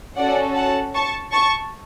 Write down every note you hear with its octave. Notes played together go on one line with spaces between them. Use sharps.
C#4 F#4 A4 D5 F#5
F#5 A5
A5 C#6
A5 C#6